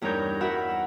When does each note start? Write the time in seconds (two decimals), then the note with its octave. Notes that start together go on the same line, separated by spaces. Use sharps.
0.01 E2 G2 D#4 A#4 C#5 G6
0.41 F#4 A#4 B4 E5 F#5 B5